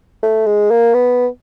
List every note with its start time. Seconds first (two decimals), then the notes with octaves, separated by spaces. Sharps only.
0.23 A3
0.47 G#3
0.71 A#3
0.94 B3